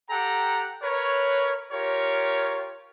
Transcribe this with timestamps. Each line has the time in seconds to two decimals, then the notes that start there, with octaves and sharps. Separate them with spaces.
0.10 G4 A4 F#5 G5 A#5
0.82 A#4 B4 C#5
1.72 F4 G4 A#4 C#5